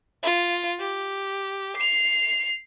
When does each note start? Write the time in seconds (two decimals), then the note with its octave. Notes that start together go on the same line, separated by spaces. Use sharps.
0.23 F4
0.80 G4
1.76 C7 F7